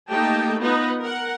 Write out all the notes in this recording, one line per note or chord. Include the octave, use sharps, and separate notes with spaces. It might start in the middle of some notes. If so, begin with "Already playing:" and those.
A3 A#3 D#4 G4 G5 A5
B3 D#4 F4 B4 D#5
A#4 F#5